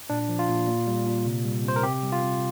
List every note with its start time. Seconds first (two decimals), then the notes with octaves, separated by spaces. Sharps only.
0.10 A#2 D4
0.29 F3
0.39 F4
0.49 A#2
0.67 A#2
0.87 G3
1.06 A#2
1.25 C3
1.45 G3
1.64 C3 C5
1.76 A#4
1.83 C3 G4
2.03 G3
2.12 F4
2.22 C3